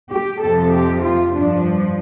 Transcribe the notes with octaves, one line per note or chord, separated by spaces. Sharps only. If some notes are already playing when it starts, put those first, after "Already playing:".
G4
F2 C3 F3 A4
G4
F4
G2 F3 D4